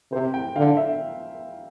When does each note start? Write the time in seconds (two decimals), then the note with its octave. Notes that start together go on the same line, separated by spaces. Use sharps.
0.12 C3 C5
0.34 G5
0.56 D3 F5
0.77 E5